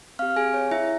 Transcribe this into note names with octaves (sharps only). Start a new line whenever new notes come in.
C4 G4 F5 F6
G#4 G#5
C#5
E4 E5